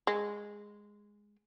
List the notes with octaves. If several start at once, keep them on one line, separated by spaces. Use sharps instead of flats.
G#3